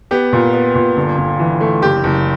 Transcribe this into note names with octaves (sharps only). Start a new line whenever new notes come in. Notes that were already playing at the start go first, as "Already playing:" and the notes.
B3 G4
A#2
B3
A#2
G1
G1
E3
A3
F#1 G4
F#1